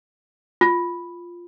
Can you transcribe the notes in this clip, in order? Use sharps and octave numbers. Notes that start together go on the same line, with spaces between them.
F4